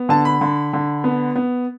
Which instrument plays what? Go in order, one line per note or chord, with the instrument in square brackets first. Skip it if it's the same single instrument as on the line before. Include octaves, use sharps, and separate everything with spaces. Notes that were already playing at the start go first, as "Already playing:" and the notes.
Already playing: [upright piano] B3
D3 A5
B5
D3
D3
B3
B3